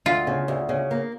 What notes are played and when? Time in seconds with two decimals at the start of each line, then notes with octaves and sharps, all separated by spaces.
0.06 D2 F4
0.27 C#3
0.48 D2
0.69 C#3
0.91 A#3